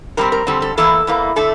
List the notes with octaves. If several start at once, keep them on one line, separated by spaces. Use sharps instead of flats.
D3 G3 C4 A#4
A#4
D3 G3 C4 A4
A4
E2 E3 A#3 A4
E2 E3 A#3
D3 A3 A4